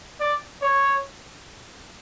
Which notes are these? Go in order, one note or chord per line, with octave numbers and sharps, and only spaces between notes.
D5
C#5